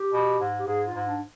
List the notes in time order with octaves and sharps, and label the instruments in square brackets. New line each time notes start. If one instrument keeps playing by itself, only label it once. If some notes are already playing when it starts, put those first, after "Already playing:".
Already playing: [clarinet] G4
[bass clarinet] B2
G#2
[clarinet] G4
[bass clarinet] G#2 [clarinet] G#4
[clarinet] F4
[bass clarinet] G#2
[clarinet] D4